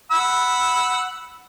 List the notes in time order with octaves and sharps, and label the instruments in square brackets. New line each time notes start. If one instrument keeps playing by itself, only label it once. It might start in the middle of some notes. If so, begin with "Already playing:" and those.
[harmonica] F#5 B5 E6